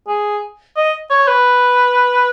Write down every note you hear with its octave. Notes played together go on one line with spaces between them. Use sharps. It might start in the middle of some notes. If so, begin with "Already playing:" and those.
G#4
D#5
C#5
B4